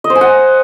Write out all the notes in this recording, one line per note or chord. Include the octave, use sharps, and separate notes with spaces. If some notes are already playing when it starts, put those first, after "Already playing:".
D#5
C5
G#5
F#5